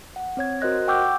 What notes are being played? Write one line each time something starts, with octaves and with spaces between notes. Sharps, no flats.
F#5
C4 C#5 G#6
F#4 A#4 C5 D#5 F#6 A#6
F#5 G5 C#6 D6 E6 G6